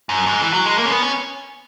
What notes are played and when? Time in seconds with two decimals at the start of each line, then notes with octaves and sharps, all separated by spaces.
0.09 F#2
0.26 G#2
0.42 E3
0.53 F#3
0.66 G#3
0.78 A#3
0.85 C#4
0.90 B3
1.02 C#4